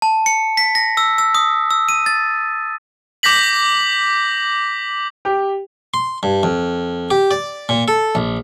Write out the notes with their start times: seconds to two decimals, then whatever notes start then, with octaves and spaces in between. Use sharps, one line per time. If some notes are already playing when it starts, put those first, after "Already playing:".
0.02 A5
0.26 C#7
0.57 B6
0.75 A#6
0.97 E6
1.18 E6
1.35 D#6
1.71 E6
1.89 D#7
2.06 A6
3.23 D6 G6 A#6 B6 F#7
5.25 G4
5.94 C6
6.23 G2
6.43 F2
7.11 G4
7.31 D5
7.69 A#2
7.88 A4
8.15 A#1